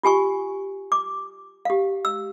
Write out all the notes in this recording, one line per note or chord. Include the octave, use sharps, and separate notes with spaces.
F4 G4 G#5 C#6
D6
G4 F5
E6